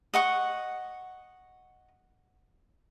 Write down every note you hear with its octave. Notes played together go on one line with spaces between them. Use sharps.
D#5 F#5 C#6